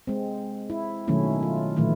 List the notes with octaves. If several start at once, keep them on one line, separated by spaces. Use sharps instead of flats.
G#3 C4
E4
B2 D#3 F#3 A3 C#4 E4
F4
A#2 D#3 E3 F#3 A3 E4